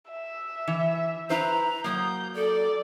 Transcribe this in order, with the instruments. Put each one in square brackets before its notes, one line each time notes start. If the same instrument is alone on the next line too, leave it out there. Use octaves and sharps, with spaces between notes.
[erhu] E5
[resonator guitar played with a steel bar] E3
[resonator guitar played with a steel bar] E4 B4 C5 [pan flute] A#5
[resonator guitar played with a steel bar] F#3 A#3 [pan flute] D#6 [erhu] G6
[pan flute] A4 [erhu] D5